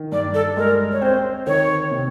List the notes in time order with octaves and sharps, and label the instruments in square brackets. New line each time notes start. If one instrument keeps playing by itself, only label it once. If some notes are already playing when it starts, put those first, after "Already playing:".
Already playing: [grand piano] D#3
[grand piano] G2 [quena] D5
[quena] A4
[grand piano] G#3 [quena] A#4
[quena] C#5
[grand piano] C4 [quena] C5
[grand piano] D#3 [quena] C#5
[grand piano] C3